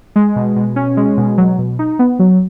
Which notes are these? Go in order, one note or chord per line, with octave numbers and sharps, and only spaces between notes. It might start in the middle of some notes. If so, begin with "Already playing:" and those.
G#3
B2
B2
C#4
G#3
B2
F#3
B2
D#4
B3
F#3